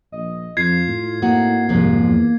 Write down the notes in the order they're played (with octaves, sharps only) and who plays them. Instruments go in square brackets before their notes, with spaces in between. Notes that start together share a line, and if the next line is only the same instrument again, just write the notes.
[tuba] A#1 [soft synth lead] D#5
[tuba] F2 [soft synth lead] F4 [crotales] G#6 C7
[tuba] A2
[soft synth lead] A#3 [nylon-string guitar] C4 D#4 F#4
[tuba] C2 [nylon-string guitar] F2 G#2 F3
[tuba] E2